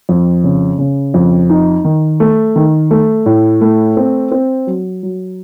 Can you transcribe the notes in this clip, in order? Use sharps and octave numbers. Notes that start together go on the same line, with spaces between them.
F2
C#3
C#3
F2
D#4
D#3
A3
D#3
A3
A2
A3
C4
C4
F#3
F#3